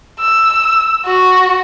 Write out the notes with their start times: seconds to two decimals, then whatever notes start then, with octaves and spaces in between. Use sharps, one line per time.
0.20 E6
1.05 F#4